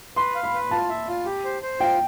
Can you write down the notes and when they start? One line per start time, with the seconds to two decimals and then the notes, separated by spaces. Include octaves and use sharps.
0.16 B4 C6
0.35 F5
0.43 B5
0.54 B4
0.71 F4 A5
0.89 E5
1.08 F4
1.25 G4
1.45 C5
1.63 C5
1.80 F4 G5